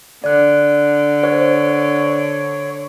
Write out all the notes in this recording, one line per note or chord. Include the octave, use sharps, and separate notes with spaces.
D3 D5 F#6
C5 C#5